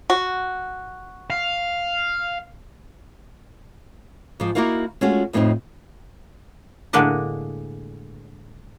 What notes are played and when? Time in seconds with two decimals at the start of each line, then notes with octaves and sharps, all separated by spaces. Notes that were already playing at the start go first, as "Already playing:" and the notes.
0.10 F#4
1.30 F5
4.40 G#2 F3
4.55 A#3 D#4 E4 F#4 A#4 F5
5.01 G#3 A3 C#4 F4 F#4
5.33 F2 A2 B3 C4 D#4
6.93 A2 D3 G#3 A#3 D4 D#5